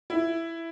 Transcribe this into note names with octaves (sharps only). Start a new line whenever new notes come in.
E4